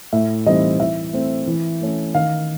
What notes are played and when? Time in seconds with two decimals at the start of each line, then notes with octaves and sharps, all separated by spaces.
0.13 A2 E5
0.46 E3 G3 C4 D#4 D#5
0.80 E3 E5
1.13 A3 C4
1.47 E3
1.81 A3 C#4
2.15 D#3 F5